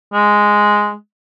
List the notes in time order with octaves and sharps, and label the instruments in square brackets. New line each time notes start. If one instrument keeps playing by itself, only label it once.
[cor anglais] G#3